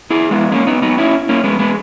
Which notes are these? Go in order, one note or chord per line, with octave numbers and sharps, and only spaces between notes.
E4 G#4
G#3 B3
A#3 C#4
B3 D#4
B3 D#4
C#4 E4
A#3 C#4
G#3 B3
G#3 B3